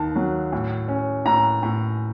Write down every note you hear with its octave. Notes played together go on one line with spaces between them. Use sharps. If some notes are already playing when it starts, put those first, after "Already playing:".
Already playing: D#2 D#3 A5
F#3
A2
C#4
A2 A#5
A2